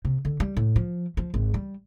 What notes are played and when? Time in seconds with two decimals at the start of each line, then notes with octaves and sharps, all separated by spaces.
0.05 C3
0.25 D3
0.40 G3
0.57 A2
0.76 F3
1.17 F3
1.34 G#1
1.54 G3